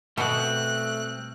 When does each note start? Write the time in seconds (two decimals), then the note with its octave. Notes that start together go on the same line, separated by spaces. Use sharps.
0.18 B2 G3 A3 C4 F#6